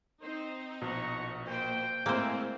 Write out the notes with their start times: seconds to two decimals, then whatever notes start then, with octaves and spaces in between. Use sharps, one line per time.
0.22 C4 D#4 C5
0.82 A#1 B2 F#5 A#5 C#6
1.48 A#3 C5 G5
2.06 A2 G#3 A#3 C4 E4 C5 G#5 E6